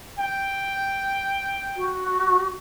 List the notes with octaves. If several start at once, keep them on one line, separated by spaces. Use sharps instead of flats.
G5
F#4